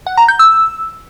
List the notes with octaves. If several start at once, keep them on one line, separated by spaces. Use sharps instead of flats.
F#5
A#5
G6
E6